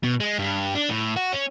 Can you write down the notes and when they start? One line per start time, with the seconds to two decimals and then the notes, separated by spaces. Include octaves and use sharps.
0.03 B2
0.20 G#3
0.39 G2
0.75 D4
0.90 A2
1.16 F#4
1.32 C#4